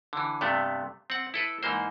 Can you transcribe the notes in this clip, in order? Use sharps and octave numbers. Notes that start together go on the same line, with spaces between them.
D3 E3
G2 C3 A3 B3
C4 F#5
E4 A4 B4
G#2 E3 A#3 C5